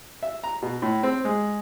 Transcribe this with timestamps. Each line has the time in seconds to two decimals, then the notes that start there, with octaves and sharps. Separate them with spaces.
0.23 E5
0.44 A#5
0.62 B2
0.82 A2
1.03 C4
1.25 G#3